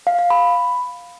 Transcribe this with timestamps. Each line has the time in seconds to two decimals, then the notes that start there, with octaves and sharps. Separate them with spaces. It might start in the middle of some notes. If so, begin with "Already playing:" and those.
0.07 F5
0.19 F5
0.30 B5